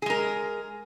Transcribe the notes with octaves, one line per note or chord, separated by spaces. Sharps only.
G#3 G#4 A#4